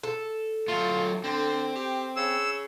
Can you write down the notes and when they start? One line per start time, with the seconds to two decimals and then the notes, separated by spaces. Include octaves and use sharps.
0.03 A4
0.68 F#3 A3 F4
1.24 D3 C4
1.75 G4
2.17 C#3 E6